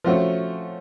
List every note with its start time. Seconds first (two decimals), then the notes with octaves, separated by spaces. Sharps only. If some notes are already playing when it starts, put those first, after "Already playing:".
0.04 F3 A3 C#4 F#4